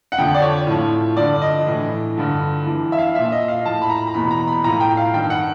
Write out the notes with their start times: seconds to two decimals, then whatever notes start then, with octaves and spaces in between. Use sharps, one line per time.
0.12 F#5
0.18 F2 D3 F3 G5
0.35 D5
0.42 C#5
0.67 A2 F3
1.17 G2 D3 F3 D5
1.42 D#5
1.66 A2 E3
2.16 G2 D3 F3
2.65 G2 E3
2.92 E5
2.99 F5
3.15 A#2 F3 E5
3.32 D#5
3.48 F5
3.65 A2 F3 A5
3.82 B5
3.90 A#5
4.07 A#5
4.14 E2 B2 B5
4.31 A#5
4.47 B5
4.64 A2 F3 A#5
4.80 G5
4.97 F5
5.14 G2 D#3 G5
5.30 F#5